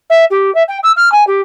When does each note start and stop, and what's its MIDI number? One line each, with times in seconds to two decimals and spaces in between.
0.10 0.25 76
0.30 0.53 67
0.55 0.63 76
0.68 0.78 79
0.83 0.92 88
0.97 1.12 89
1.12 1.26 80
1.27 1.41 67